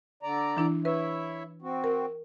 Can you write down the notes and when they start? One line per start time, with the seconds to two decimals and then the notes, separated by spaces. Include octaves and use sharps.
0.23 D3 D5 A#5
0.57 E3 D4 E4
0.85 E4 B4 C#5 E5
1.62 C4 F#4
1.84 A#4